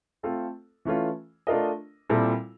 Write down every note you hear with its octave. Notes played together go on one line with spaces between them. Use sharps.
A3 C4 F4 A4
E3 A3 C#4 F4
A3 D4 F4 A#4 D#5
A#2 G3 C4 E4 A4